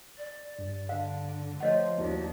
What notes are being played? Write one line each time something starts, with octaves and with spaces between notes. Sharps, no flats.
D5
G2
D3 D4 F5
F3 A3 C#5 D#5 F#5
D#2 A#3 D4 E4 F#4